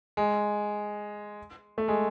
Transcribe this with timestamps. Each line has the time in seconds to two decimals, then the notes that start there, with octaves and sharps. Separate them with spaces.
0.17 G#3
1.78 A3
1.88 G#3